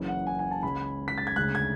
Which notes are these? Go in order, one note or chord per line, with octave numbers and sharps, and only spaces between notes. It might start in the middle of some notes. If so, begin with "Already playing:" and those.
Already playing: F#1 F#2 C#3 E3
F#5
G#5
G#5
A5
C#2 C#3 G#3 B5
B6
A6
G#6
D2 C#3 G#3 F#6
G#6